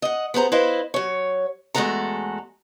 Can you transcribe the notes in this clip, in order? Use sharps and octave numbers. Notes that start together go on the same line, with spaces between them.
D#5 F#5
B3 G#4 C5 A#5
E4 B4 C5 D#5 F5
F#3 C#5
E2 G#3 A3 F#4 A4 A#5